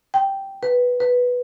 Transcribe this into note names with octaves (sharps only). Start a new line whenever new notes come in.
G5
B4
B4